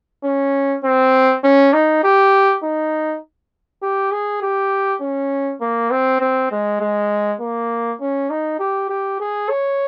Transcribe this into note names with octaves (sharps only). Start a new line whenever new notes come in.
C#4
C4
C#4
D#4
G4
D#4
G4
G#4
G4
C#4
A#3
C4
C4
G#3
G#3
A#3
C#4
D#4
G4
G4
G#4
C#5